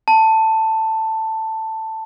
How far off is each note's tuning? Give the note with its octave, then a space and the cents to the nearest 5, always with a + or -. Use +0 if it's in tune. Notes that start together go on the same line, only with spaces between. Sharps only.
A5 +10